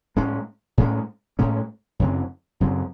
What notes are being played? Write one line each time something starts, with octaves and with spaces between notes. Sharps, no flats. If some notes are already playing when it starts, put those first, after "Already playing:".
A2 G#3 C#4
A2 G#3 C#4
A2 G#3 C#4
F#2 C#3 F#3 C4
F#2 C#3 F#3 C4